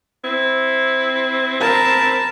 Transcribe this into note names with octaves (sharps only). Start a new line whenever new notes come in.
C4 E4
A#4 A5 B5